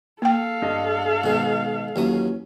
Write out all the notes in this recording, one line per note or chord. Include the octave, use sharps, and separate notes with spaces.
A#3 A4 F5 G5
G2 D#5
G#2 B2 D#3
D#2 E3 F#3 C#4 D#6